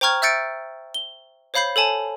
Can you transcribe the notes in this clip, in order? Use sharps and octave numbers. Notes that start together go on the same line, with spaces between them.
C5 G5 A#5 C#6 F6 G#6
E5 E6 G6 A6 C#7 D7
G7
C5 C#5 F5 B5 G6 C7
A4 C#5 G#5 A5